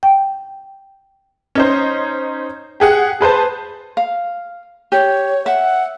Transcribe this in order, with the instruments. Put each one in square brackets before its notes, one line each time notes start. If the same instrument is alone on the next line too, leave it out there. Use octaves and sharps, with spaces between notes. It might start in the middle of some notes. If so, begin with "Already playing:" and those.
[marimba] G5
[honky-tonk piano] C#4 D#4 C5
G4 G#4 F#5
G#4 B4 C5 A5
[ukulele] F5
[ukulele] G4 [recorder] C#5
[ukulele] E5 [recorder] F#5